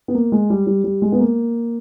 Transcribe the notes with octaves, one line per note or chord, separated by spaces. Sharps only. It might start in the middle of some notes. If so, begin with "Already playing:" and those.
B3
A#3
G#3
G3
G3
G3
G#3
B3
A#3